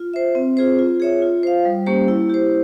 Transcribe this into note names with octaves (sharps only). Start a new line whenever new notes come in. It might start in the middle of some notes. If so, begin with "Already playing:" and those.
Already playing: F4
C5 E5
C4
F4 G#4 C5
F4
G#4 C#5 E5
F4
C5 F5
G3
A#3 C#4 G4 C5
E4
G4 C5